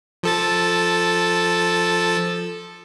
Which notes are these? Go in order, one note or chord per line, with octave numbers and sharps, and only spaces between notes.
F3 A4 A6